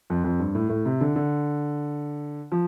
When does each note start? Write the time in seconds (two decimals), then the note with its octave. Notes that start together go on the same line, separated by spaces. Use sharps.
0.10 F2
0.24 F2
0.39 G2
0.55 A2
0.69 A2
0.85 C3
1.01 D3
1.16 D3
2.52 F3